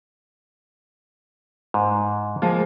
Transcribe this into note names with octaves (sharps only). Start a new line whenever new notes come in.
G#2
F3 G#3 A#3